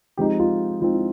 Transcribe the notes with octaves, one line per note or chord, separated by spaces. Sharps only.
F3 G#3 C4 D#4 G4
F4
F3 G#3 C4 D#4 F4
E4